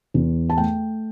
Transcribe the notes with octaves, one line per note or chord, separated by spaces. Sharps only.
E2
A5
A3 G5